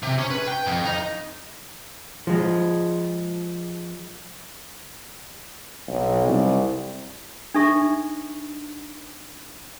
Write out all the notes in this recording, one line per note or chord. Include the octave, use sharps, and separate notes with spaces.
C3
C#4
B4
G5
F2
D#4
F3 G#3
B1
C2
D4 D#4 A4 E5 C#6